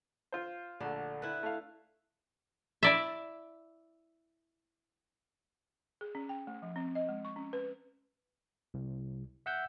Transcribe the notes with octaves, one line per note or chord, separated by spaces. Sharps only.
F4 C5
A#1 D3 A3
E4 B4
A3 F5
E4 D5 E5
G#4
C#4
G5
A3
F3
C4
D#5
G#3
C#6
C#4
B4
C2
E5 F#5 E6 G6